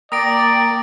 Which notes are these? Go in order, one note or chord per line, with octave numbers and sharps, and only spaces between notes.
A#3 D5 G5 D#6 A#6 D7